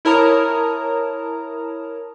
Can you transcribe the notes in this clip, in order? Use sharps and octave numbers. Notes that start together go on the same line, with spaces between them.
E4 A#4 C#5 A5 A#5 D#6